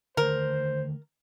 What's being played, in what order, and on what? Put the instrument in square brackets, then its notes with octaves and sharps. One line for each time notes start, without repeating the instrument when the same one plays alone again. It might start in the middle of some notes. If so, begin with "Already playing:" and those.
[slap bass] D3 D#3 A3 [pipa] A#4 [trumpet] C5